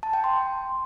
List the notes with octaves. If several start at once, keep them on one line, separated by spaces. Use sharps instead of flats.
A5
G5
C6